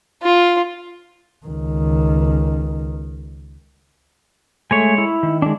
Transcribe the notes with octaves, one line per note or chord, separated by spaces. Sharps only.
F4
C#2 D#3
G#3 A3 C#5 G#5
E4
D#3
G#3 D4